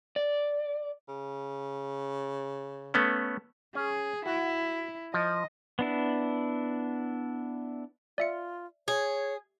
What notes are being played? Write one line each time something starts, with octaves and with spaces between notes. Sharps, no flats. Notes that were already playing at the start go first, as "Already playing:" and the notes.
D5
C#3
A3 B3 C#4
C#4 G#4
E4 F#4
F3 D#5
B3 D4 E4
F4 D5 E5 C#7
G#4 C#5